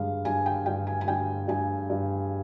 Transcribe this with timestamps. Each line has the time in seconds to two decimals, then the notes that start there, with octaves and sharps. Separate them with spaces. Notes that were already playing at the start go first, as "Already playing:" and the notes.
Already playing: G2 G#3 F5
0.25 G2 G#5
0.46 G5
0.66 G2 G5
0.87 G#5
1.01 G#5
1.07 G2 G5
1.48 G2 G#5
1.90 G2